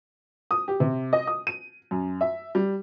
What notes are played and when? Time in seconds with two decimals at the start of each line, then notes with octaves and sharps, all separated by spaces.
0.51 D#6
0.68 G4
0.80 C3
1.13 D#5
1.27 D#6
1.47 D#7
1.91 F#2
2.21 E5
2.55 G3